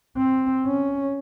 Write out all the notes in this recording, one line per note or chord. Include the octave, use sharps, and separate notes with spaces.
C4
C#4